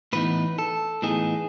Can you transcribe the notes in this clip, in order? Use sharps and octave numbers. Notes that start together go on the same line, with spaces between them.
A2 E3 B3 D#4 B4
A4
A2 E3 B3 D#4 G#4